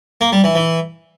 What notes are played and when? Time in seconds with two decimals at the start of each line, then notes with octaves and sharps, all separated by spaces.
0.21 A#3
0.32 G3
0.44 E3
0.55 E3